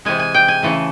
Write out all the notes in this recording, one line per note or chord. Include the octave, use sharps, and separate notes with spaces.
C3 E3 G#3 G#5
G#5
G5
G#5
C#3 E3 A3